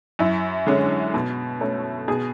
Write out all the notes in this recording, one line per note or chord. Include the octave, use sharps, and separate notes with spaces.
F#2 E4
D3 G#3 C#4
B2
A3 C#4
B2 G#4